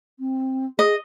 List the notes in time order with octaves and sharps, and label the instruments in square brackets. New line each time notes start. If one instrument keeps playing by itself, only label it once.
[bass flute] C4
[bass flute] G#4 [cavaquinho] D#5